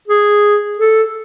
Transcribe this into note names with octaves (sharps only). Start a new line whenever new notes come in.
G#4
A4